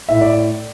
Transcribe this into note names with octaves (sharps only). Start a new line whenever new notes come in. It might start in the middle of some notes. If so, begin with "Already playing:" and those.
A2 E5
D5